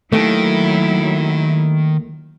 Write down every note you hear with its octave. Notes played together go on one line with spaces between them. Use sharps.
D#2 D#3 F#3 A3 E4